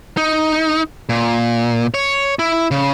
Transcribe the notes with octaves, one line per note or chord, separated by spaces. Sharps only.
D#4
A#2
C#5
E4
C#3